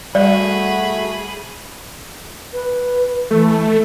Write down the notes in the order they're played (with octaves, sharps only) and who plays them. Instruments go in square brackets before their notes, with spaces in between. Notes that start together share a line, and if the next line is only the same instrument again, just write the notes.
[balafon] G3 [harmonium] A3 F#4 [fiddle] G#4 B5 [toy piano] D5
[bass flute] B4
[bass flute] E3 [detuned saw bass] A3